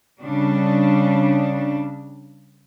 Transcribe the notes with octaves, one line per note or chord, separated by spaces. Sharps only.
C#3 G3 D4